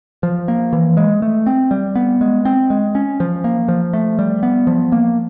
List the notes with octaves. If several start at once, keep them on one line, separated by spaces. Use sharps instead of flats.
F3
A#3
E3
G#3
A3
C4
G3
B3
G#3
C4
G#3
C#4
F3
A#3
F3
A3
G3
B3
F3
A#3